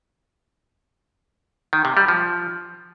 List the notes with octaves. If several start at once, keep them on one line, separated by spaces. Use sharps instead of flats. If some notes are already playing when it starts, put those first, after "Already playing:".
D#3
C3
G3
F3